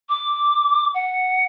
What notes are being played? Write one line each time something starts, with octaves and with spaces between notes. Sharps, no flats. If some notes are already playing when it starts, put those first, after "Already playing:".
D6
F#5